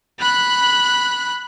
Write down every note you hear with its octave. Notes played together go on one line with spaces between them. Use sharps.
B5 F#6